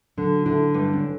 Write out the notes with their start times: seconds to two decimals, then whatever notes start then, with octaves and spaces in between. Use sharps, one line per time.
0.17 D3 F#3
0.46 D3 E4
0.74 G2 E4
0.93 C#4